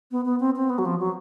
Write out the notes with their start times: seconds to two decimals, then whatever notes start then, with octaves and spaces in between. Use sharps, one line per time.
0.11 B3
0.25 B3
0.40 C4
0.56 C4
0.70 B3
0.79 F#3
0.85 F3
1.00 F#3